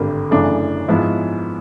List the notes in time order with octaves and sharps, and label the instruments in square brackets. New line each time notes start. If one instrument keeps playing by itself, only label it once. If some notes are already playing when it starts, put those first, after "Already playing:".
Already playing: [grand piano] G#1 G2 D3 G3 A#3
F#2 C#3 E3 A3 D4
G#2 F3 G#3 B3 E4